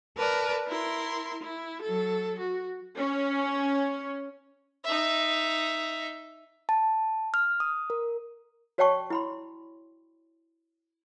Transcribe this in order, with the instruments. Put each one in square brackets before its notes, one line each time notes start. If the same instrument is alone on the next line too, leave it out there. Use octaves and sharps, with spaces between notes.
[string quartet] A#4 B4 D5 A5
E4 A#4 C6
E4
F#3 A4
F#4
[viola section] C#4
[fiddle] D#4 E5
[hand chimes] A5
F6
D#6
A#4
[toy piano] F#4 C#5 D5 G5 A5 C#6
E4 B5 C6